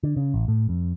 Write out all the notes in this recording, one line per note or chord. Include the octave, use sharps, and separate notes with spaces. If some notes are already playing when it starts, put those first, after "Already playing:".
D3
C#3
A1
A2
F2